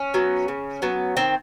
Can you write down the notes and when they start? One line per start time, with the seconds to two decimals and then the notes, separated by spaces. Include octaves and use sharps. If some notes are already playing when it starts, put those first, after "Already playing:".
Already playing: C#4
0.14 F#3 B3
0.48 C#3
0.82 F#3 B3
1.17 D#3 C4